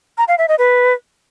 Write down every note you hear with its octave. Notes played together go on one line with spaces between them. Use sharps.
A#5
F5
E5
D#5
B4